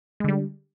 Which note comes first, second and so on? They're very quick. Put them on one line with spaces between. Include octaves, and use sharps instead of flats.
G#3 D3 G3